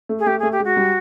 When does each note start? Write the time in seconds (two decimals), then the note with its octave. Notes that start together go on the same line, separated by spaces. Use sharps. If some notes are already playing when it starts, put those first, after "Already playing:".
0.09 A3
0.19 G#4
0.26 A3 G4
0.39 G#4
0.43 A3
0.51 G4
0.60 G#3 F#4
0.77 G3